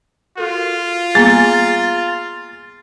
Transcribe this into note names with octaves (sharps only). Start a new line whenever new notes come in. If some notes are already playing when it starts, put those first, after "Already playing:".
F4 F#4 A4 A#4
G3 A#3 B3 G#4 G#5 A#5 A6